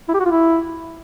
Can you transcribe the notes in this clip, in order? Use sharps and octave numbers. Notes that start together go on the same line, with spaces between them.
E4
G4
F#4
F4
E4